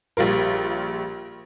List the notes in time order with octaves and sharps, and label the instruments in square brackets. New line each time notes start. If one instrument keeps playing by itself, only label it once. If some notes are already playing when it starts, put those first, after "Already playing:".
[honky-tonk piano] A#1 G3 F4 A#4